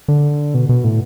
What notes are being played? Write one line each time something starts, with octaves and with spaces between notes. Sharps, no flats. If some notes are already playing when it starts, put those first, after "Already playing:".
D3
B2
B2
A2